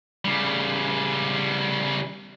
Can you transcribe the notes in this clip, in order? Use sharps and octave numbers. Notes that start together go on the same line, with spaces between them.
C#3 G3